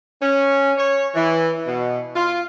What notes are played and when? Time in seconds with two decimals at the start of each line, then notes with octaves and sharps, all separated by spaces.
0.22 C#4
0.78 C#5
1.15 E3
1.67 B2
2.15 F4